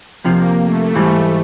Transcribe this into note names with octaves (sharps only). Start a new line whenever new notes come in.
F2 C3 F3 A#3
A3
G#2 E3 G3